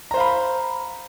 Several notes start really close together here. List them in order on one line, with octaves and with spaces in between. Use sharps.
A#5 C5 F5 B5